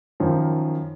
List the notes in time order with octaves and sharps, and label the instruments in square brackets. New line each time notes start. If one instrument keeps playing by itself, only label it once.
[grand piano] F#2 D#3 F3